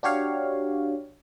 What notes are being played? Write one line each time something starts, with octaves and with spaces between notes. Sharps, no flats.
D4 F#4 G4 C#5 F5